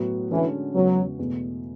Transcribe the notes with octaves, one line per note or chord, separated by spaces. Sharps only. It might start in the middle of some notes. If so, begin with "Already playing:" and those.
Already playing: A2 F#3 B3 F#4
D3 E3 G#3 C#4 F#4 A4
E2 C#3 F#3 G#3 B3 F#4
E2 B2 A3